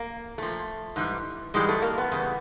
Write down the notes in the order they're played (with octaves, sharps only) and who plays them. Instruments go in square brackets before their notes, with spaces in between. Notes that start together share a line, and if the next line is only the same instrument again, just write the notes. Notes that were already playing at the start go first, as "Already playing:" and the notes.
Already playing: [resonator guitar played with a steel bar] A#3
A#2 F3 A3
G#2 E3 G3
G#2 E3 G3 G#3
A3
A#3
B3
E2 C#3 G3